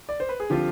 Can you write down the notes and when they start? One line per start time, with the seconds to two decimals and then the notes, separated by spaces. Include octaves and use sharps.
0.09 D5
0.20 C5
0.29 B4
0.40 G#4
0.50 D3 F3 C4 F4 G4